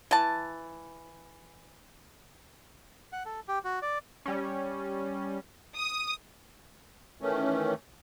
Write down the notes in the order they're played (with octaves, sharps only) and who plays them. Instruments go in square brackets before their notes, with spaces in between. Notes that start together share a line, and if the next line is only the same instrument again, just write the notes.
[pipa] E3 A5
[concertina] F#5
A4
G4
F#4
D5
[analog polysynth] G3 C#4
[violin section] D#6
[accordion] D#3 E3 A3 C#4